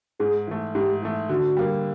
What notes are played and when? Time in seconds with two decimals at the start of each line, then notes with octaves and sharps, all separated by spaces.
0.20 G#2 G#4
0.47 E3 A3
0.75 G#2 G4
1.02 E3 A3
1.29 D3 F#4
1.57 G3 A#3